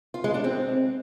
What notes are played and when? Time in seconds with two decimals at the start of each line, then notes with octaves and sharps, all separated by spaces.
0.14 F4
0.24 G#3
0.34 D4
0.44 C4